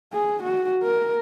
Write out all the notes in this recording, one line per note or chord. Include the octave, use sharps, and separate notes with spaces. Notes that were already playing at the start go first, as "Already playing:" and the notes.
G#4
F#4
A#4